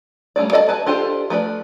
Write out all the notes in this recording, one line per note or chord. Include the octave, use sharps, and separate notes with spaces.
G3 A3 C#4 D5
A4 D5 D#5 F#5 A5
B4 G#5 A5
D4 F4 G4 A4 C5
F3 A3 B4 D5